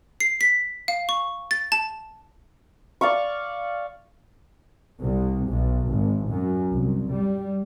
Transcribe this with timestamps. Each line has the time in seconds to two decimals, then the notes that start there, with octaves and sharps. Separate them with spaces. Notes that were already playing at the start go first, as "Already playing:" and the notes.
0.20 C7
0.41 B6
0.88 F5
1.09 C#6
1.51 A6
1.72 A5
3.01 D5 F5 C#6
5.00 C2
5.49 B1
5.90 G#1
6.30 F#2
6.71 C2
7.12 G3